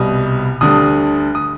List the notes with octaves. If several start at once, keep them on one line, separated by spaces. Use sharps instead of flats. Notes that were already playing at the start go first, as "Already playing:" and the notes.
Already playing: C2 B2 G3 D#6
D2 D3 G3 D#6
D#6